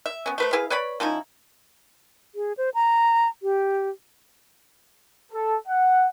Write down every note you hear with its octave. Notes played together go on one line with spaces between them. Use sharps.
E5
B3 C#4
A3 B4 C5
E4 G#4 B4 F5
B4 C#5 D5 B5
F3 C#4 D#4 E4
G#4
C5
A#5
G4
A4
F#5